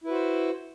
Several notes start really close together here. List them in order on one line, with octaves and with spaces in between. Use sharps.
E4 B4 F#4 C5